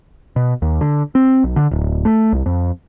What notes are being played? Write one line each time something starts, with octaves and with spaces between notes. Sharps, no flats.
B2
D#2
D3
C4
B1
D3
D1
A3
C2
F2